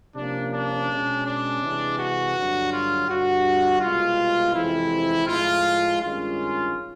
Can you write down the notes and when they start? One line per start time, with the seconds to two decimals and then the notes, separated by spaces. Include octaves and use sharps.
0.16 C3 F3 A#3 C#4 D4
0.53 D4
0.89 B2 G#3 C#4
1.26 D4
1.62 C3 E3 G#3
1.98 F#4
2.35 G2 D3 F#3
2.72 F4
3.08 G2 D3 G3 F#4
3.80 C2 B2 G#3 F4
4.54 F2 C3 E3 G#3 C4 E4
5.27 A2 F3 G#3 F4
6.00 G2 D#3 G#3 C#4 F4